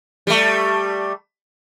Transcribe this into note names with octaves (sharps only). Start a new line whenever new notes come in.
G3 A3